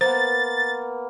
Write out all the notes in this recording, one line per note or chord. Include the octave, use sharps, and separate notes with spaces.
A#3 B3 C5 A6